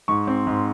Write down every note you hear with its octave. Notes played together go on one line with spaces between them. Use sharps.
G#2 C#6
C4
G#2